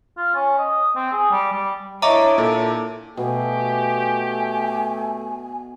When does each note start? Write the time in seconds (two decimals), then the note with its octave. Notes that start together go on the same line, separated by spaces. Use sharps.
0.17 F4
0.35 C#4
0.58 D#5
0.96 C4
1.13 G#4
1.31 G3
1.52 G3
2.02 D4 E4 C#5 D#5 E5 A#5 C#6 D6
2.38 A#2 A4
3.17 B2 A3 G4 G#5